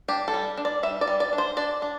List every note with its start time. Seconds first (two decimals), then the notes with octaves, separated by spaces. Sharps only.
0.08 D4 G4
0.28 A4
0.34 G3
0.57 D4
0.65 D5
0.83 G3 E5
1.01 D5
1.07 G3
1.20 D5
1.33 D4
1.38 C5
1.57 D4 D5
1.82 D4